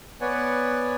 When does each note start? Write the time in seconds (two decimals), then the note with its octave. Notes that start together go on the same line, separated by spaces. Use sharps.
0.21 B3 B4 C#5 D5 F#5 G#5